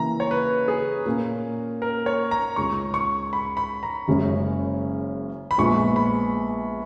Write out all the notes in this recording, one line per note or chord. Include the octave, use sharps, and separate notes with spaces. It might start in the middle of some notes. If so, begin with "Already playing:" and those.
Already playing: C#3 E3 A#3 E4 A#5
C#5
B4
G#4
A#2 A#3 C#4
A#4
C#5
A#5
C#2 C#3 G#3 C#6
C#6
B5
B5
A#5
F#1 F#2 C#3 G#3 C#4
B5
A#1 A#2 G#3 B3 C#6
B5